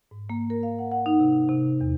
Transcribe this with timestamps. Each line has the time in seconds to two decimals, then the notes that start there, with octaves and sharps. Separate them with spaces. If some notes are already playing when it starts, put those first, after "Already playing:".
0.11 G#2
0.30 A#3
0.50 A#4
0.63 F5
0.79 F#5
0.91 F#5
1.06 D#4
1.20 C3
1.49 C3
1.81 E2